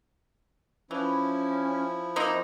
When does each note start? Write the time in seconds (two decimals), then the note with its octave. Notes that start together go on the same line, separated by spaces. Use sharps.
0.91 E3 F3 C#4 E4
2.16 A#3 C4 D#4